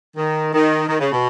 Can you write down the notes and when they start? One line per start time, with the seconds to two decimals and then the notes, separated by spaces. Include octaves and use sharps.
0.17 D#3
0.53 D#3
0.88 D#3
0.99 C#3
1.12 B2